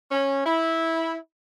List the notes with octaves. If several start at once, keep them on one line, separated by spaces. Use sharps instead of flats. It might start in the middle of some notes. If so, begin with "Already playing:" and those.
C#4
E4